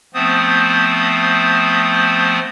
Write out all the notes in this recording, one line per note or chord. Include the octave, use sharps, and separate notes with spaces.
F3 A3 B3 C4 C5 D#6